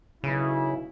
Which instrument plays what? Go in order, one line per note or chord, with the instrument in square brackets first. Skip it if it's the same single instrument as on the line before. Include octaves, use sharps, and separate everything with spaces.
[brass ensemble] B1 E4 [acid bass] C#3